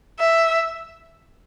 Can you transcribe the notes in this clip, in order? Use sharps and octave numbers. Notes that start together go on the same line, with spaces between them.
E5